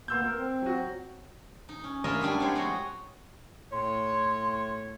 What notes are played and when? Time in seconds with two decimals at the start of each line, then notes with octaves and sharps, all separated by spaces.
0.08 D2 A#3 B3 C6 E6 G6
0.23 A#4
0.36 C4
0.62 F#3 F#4
1.69 D#4
1.84 C#4
2.04 G2 E4 F4 A#4 D#5 E5
2.21 F#3 G3 D4 E4
2.40 F#3 G#3 C4 A4 C5 C#5
2.55 F#3 G#3 F#4 C#5 D#5
3.72 A2 C#5 C6